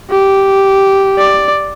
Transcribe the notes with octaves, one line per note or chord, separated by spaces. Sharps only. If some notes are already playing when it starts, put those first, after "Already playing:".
G4
D5